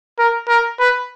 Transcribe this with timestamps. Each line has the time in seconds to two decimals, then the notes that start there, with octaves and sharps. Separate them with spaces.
0.19 A#4
0.49 A#4
0.80 B4